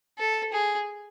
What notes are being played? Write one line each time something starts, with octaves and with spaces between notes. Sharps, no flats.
A4
G#4